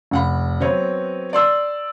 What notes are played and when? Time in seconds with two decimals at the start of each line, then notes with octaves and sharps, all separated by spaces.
0.11 F1 F#5 B5
0.60 F#3 B3 C4 B4 C#5
1.33 D5 C6 E6